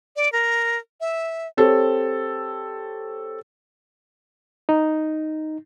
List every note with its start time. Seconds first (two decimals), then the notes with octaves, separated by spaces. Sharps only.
0.16 D5
0.32 A#4
1.01 E5
1.57 C4 G4 A4 C#5
4.69 D#4